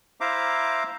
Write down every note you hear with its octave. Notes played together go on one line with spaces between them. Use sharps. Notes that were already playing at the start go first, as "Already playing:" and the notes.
E4 C5 E5 F5 A#5 D6